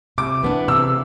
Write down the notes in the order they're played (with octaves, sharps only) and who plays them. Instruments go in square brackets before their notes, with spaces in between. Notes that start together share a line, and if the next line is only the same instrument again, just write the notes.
[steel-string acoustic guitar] C3 [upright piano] D6
[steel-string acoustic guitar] E3 B3 D4
[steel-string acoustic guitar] C3 [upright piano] E6